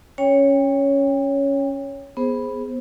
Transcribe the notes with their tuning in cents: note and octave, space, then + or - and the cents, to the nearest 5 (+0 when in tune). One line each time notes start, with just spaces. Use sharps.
C#4 +0 C#5 +0 G5 +30
B3 +0 G#4 +0 C5 +5